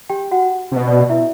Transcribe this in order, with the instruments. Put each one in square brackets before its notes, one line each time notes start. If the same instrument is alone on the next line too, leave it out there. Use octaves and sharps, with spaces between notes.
[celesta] G4 G5
F#4 F#5
[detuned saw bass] C3
[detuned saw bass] B2 [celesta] D#5
[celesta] D5
E4 E5